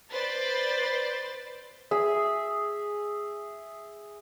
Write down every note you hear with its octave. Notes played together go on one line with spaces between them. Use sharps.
B4 C5 D5 A6
G#4 E5